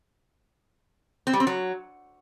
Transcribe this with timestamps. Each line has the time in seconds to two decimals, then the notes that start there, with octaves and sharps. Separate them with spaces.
1.27 C4
1.33 G3
1.40 C4
1.47 F#3